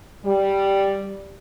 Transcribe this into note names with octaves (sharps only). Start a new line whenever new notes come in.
G3